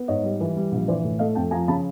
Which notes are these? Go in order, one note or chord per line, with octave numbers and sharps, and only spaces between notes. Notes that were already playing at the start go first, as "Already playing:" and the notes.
Already playing: B3
G#2 C#5 D#5
G3
E3
G3
A#1
E3 C5 D5
A2
A3 D#5 F5
F2 G5 A5
F3 G#5 A#5
C#3 A5 B5